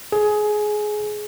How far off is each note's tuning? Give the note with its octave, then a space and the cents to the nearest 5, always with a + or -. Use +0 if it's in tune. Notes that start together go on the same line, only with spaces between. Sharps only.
G#4 +15